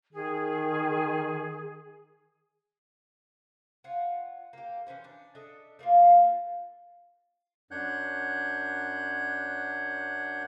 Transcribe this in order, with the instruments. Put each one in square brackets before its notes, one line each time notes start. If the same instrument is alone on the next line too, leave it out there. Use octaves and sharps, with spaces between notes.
[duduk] D#3 [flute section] G#4
[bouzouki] F4 C#5 F#5
A#3 G4
E3 F3 C#4 C5
D4
D4 A4 D#5 E5
A3 A#3 D#4 F4
[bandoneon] F#2 D4 C#5 F#5 F#6 G6